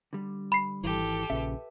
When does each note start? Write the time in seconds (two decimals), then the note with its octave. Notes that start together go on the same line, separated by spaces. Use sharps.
0.13 D3 G3
0.52 B5 C7
0.84 G#1 E3 G4 A4
1.30 A#1 C#3 B4 E5